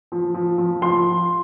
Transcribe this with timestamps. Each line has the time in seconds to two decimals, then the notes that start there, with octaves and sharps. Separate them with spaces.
0.12 F3
0.34 F3
0.58 F3
0.82 F3 C6